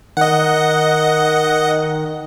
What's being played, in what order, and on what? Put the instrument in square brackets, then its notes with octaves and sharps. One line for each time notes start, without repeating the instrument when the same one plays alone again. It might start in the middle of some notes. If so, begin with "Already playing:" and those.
[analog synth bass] D#3 [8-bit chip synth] D#5 F#5